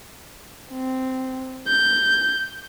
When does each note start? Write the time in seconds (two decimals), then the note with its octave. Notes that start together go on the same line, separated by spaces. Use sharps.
0.72 C4
1.68 G6